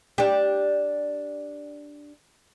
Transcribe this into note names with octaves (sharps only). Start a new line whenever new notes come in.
D4 G4